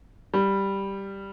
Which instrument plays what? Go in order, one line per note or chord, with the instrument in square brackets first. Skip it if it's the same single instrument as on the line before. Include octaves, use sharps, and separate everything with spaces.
[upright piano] G3